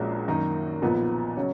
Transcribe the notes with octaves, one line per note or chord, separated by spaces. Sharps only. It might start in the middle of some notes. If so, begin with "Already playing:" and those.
Already playing: A#1 A#2 G#3 C#4 F#4
F#2 D#3 A#3 D#4
B1 A#2 F3 B3
C#3 F#3 C#4